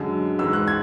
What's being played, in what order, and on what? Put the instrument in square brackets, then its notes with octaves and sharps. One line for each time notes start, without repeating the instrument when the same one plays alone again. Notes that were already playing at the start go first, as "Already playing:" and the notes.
Already playing: [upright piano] F#2 D3 G#3
G#2 E3 G#3 E6
F#6
G#6